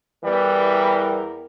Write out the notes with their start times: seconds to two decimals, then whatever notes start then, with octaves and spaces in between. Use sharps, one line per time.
0.24 E2 E3 G3 A#4